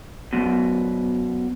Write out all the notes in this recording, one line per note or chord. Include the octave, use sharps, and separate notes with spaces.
B1 F#2 B2